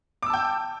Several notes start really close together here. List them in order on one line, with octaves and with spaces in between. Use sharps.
D6 E6 A5 G5